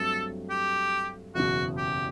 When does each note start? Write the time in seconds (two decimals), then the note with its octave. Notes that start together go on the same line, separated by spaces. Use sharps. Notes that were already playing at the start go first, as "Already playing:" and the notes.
Already playing: G2 F#3 A3 C4 A4
0.50 G4
1.35 F#1 E2 B2 F#4
1.77 G4